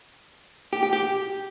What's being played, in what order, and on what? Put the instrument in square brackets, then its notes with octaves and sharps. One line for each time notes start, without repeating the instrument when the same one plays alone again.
[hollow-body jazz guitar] G4
G4
G4